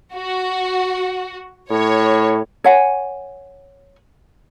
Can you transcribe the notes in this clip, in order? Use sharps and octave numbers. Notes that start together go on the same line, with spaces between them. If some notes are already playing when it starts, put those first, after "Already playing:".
F#4
A2 C#5
C#5 F#5 G#5